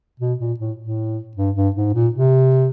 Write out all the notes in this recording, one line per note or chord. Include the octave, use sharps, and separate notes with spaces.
B2
A#2
A2
A2
G2
G2
G#2
A#2
C3